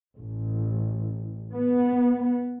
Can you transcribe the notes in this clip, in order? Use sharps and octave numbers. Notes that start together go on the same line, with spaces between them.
A1
B3